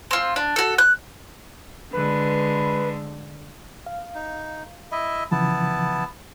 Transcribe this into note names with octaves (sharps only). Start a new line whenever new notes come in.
C4 F4
D4
F#4 A4
F#6
D3 G#3 B4
F5
D#4
E4 D#5 E5
C#3 E3 F3 B3 E4 A5